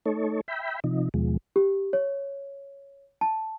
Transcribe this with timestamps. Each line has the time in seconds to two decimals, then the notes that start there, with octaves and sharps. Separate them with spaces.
0.06 A3 D#4 A4 C#5
0.48 E5 G5 B5
0.84 C3 F3 D#4
1.14 D#2 B2 F3 G#3
1.56 G4
1.93 C#5
3.21 A5